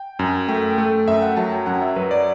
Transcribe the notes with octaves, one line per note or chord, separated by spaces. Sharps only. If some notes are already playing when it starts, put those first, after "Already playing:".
Already playing: G5
F#2
A3 G5
A3
F#2 E5
F#5
F#3 A5
G5
F#2 F#5
E5
F#3 B4
D5